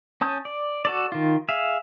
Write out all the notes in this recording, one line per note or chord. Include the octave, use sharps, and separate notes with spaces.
C#4 A5 D#6 G6
D5
F#4 A4 D5
D#3 F4
G#4 E5 F5